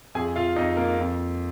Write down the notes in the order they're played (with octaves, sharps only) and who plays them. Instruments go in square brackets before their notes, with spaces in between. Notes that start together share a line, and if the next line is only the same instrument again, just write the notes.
[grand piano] F2 G#4 G#5
F4 F5
F2 D#4 D#5
A#3 A#4
F2